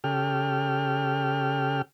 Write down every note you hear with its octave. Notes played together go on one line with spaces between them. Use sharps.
C#3 G4 A4 G5 F6